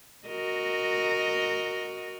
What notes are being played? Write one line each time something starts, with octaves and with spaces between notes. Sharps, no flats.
F#4 A#4 D#5